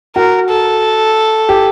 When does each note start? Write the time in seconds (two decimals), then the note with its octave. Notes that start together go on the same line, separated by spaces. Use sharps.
0.16 F#4 A#4
0.49 A4
1.49 G4